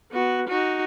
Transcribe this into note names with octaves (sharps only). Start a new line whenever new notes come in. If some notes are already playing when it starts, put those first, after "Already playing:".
B3 F#4
D#4 F#4